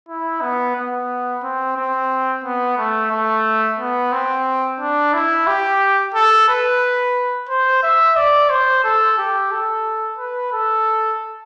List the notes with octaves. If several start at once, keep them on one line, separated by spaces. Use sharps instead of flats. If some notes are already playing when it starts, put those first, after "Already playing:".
E4
B3
B3
C4
C4
B3
A3
A3
B3
C4
D4
E4
G4
A4
B4
C5
E5
D5
C5
A4
G4
A4
B4
A4